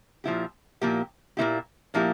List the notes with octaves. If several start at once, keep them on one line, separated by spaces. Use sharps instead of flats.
A#2 F3 A#3 E4 G4
A#2 F3 A#3 E4 G4
A#2 F3 A#3 E4 G4
A#2 F3 A#3 E4 G4